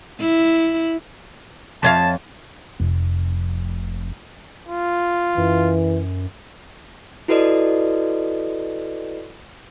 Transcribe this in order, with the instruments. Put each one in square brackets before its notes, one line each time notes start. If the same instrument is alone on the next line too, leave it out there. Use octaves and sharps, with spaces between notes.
[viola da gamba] E4
[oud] F2 C#5 F5 [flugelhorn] A5
[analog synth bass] F1
[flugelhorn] F4
[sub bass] F#2 [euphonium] E3
[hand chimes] E4 F#4 A4 B4 D5 D#5